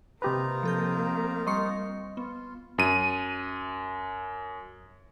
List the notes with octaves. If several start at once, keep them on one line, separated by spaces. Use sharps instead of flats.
C3 A#3 C4 D#4 F4 G4 B4 A#5
F3 A4 G6
G3 D#5 C6 C#6 C#7
B3 F4
F#2 D#7